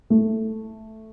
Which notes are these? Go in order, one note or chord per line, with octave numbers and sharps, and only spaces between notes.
A3